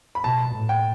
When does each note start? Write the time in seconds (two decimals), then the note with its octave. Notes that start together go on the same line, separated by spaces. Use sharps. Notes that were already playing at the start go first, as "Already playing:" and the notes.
0.15 B5
0.24 B2 A5
0.54 A2
0.69 G5